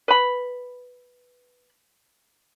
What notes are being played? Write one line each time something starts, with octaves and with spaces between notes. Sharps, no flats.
B4 B5